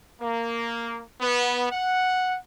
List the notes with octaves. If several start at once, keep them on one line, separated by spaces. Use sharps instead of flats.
A#3
B3
F#5